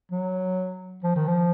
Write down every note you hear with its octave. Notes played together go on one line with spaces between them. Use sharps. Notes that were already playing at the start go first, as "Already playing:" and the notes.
F#3
F3
D#3
F3